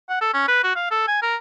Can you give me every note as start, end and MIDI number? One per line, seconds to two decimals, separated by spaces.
0.09 0.21 78
0.21 0.32 69
0.34 0.46 61
0.48 0.62 71
0.63 0.73 66
0.76 0.88 77
0.91 1.06 69
1.07 1.20 80
1.22 1.36 70